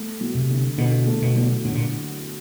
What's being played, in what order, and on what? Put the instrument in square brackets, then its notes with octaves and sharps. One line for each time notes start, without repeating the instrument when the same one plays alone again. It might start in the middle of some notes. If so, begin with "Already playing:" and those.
Already playing: [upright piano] A3
F#3
[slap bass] C3
[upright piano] D3
[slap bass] B2 [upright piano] D3
[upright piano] A3
[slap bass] B2
[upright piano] F#3
[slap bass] A2 [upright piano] D3
[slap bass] A#2